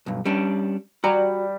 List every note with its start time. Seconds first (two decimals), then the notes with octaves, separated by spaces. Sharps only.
0.06 B1 G2
0.26 G3 C#4 D4
1.04 G3 F#4 A#5